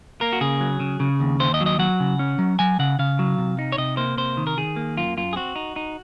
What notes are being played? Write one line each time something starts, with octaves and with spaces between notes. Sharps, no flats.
A#3 A#4
F#4
C#3 G#4
F#3
C#3
C#3
D#2
D#2 C5
D#5
F#3
D#5
F#3 F#5
C#3
C#4
F#3
F#3 G#5
C#3 F#5
C#3 F5
F#3
C3
D#4
C#5
C3 D#5
A#3 C5
C3 C5
D#3
A#4
D#3 G#4
A#3
F#2 F4
F#2 F4
G#4
C4 F#4
D#4
D#4